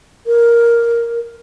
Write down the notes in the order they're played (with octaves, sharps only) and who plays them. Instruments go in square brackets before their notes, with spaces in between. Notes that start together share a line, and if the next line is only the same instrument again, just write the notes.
[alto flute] A#4